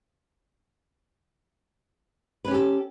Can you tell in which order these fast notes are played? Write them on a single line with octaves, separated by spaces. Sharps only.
B4 C#4 G4 A4